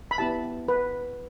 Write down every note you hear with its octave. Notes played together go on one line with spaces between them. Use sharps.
B5
B3 E4 G4 A5
B4